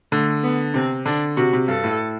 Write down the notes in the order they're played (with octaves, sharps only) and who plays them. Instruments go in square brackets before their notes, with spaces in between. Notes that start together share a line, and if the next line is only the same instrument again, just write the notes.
[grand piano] D3 [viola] A3
[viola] B3
[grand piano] C3 [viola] C4
[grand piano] D3 [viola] D4
[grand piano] C3 [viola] F#4
[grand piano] C3
[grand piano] G2 [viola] A4
[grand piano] A2